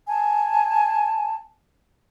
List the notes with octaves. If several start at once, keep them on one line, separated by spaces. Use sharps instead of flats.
G#5 A5